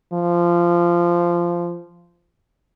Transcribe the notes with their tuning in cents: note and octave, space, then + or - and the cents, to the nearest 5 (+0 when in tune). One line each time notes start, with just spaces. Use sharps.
F3 -15